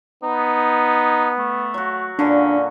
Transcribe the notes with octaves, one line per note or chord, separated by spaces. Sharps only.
B3 D#4
A3
F#3 F#4
A#2 D3 C#4 D4